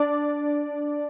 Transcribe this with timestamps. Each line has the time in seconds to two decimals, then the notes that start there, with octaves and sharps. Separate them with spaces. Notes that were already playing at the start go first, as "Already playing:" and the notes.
Already playing: D4 D5